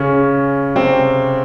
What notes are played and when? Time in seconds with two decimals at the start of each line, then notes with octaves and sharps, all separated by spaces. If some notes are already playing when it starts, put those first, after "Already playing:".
Already playing: C#3 C#4
0.75 C3 C4